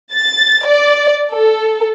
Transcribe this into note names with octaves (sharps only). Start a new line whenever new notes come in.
A6
D5
A4